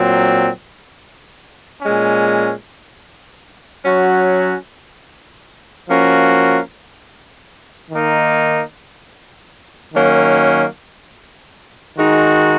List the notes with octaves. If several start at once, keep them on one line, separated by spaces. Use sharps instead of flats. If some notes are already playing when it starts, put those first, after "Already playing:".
Already playing: A#2 F#3 C4
A#2 G#3 C#4
F#3 C#4 F#4
F3 A#3 C#4 F#4
D#3 A#3 D#4
D#3 F#3 A#3 C#4
D#3 G#3 D#4 F#4